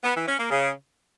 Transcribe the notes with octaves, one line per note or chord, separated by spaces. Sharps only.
B3
E3
C#4
A#3
C#3